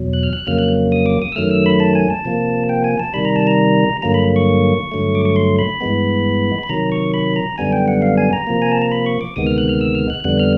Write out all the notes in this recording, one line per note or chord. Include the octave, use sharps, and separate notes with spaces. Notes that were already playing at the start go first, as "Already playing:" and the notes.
Already playing: E2 B2 F#3
F#6
F6
F#6
F2 C#3 F#3 A#3 F6
F#6
D#6
D6
D#6
E6
F#2 D#3 F#3 A3 F6
E6
B5
A5
G#5
A5
C3 F3 A#3
G5
G#5
A5
C3 D#3 G3 B5
A#5
A5
A#5
G2 D3 F#3 A#3 A#5
B5
C#6
G2 D3 F#3 A3
D6
C#6
C6
B5
G2 E3 G#3 B3
B5
C3 D#3 F#3 A#5
C#6
B5
A#5
F#2 D3 G3 B3 G#5
G5
F#5
F5
G#5
A#5
C3 F3 A#3
G#5
A5
A#5
B5
C#6
D6
D2 C3 D#3 G#3 B3 D#6
F6
F#6
F6
E6
F6
F#6
F2 D3 G3 B3 F#6
F6